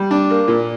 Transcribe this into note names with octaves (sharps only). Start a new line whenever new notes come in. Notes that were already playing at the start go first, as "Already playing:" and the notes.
Already playing: G3
D4
A#3
A#2